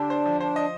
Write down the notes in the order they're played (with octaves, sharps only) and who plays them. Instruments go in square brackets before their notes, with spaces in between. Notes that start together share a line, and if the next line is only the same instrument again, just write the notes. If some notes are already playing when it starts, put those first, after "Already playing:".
Already playing: [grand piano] D3 G4 [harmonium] D4
[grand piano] C5
F3
[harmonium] D4 [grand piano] C5
[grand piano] D#5